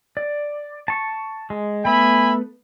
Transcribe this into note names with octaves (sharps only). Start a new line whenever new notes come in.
D5
A5 C#6
G#3
A3 B3 E5 G#5 B5